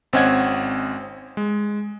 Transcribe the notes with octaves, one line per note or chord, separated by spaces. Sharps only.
G#1 C4 C#4 D#5 F#5 G#6
G#3